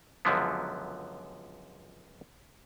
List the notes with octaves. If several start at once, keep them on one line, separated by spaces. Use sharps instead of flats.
C#2 F#2 D3 F3 F#3 B3